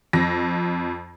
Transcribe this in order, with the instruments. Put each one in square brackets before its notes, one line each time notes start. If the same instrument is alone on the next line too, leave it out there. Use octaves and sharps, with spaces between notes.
[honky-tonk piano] F2 A#6